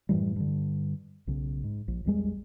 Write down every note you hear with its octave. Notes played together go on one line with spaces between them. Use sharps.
F#2 A2 E3 G3
G2 D3
B1 C#3
G#2
A#1
A#1 E2 G3 G#3